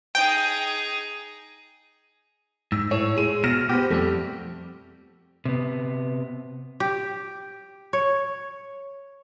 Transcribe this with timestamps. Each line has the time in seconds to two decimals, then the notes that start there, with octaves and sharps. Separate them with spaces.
0.15 D#4 G#4 G5
2.72 G#2 E6
2.91 A2 A3 C#5
3.17 G#3 D#7
3.44 B2 F6 A#6 E7
3.69 B3 G4 C5
3.90 F2 G3 A3
5.45 C3 B3
6.80 G4
7.93 C#5